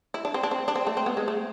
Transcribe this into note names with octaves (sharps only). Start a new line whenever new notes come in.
E4
D4
C4
D4
C4
D4
C4
A3
C4
B3
G#3
A3